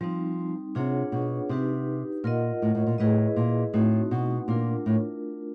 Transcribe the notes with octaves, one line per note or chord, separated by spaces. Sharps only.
F3 G3 C4 D#4
C3 D4 F4 G#4 C#5 F#5
B2
C3 D#4 G4 B4
A#2 F4 A#4 D#5 F#5
A2
A2
A#2
A2 E4 G#4 B4 D#5
A#2
A2 A3 C4 D#4 F#4
B2
A#2 A3 D4 F4 A#4
A2